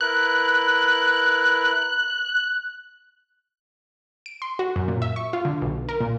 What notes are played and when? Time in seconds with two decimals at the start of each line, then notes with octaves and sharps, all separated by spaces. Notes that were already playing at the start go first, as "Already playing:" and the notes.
0.01 E4 A#4 B4 F#6
4.26 D7
4.42 C6
4.59 F#4
4.76 F#2
4.88 A#2
5.02 E5
5.16 C#6
5.33 F4
5.45 D3
5.62 B1
5.89 A#4
6.00 A#2